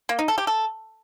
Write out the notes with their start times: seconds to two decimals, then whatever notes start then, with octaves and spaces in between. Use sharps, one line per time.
0.09 A#3
0.19 D#4
0.28 A4
0.38 G4
0.47 A4